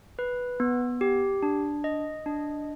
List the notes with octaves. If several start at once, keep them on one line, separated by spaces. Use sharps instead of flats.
B4
B3
G4
D4
D#5
D4